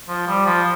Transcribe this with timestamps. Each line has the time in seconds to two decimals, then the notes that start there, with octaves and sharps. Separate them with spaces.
0.08 F3
0.28 G3
0.46 F3